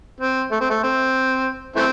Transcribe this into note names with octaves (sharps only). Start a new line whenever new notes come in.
C4
A3
C4
A3
C4
E3 A3 C4